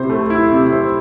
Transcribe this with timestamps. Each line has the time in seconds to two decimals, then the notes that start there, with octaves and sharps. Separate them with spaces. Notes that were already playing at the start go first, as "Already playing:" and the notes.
Already playing: C3 E4 C5
0.10 A3
0.30 E4
0.51 C3
0.72 C5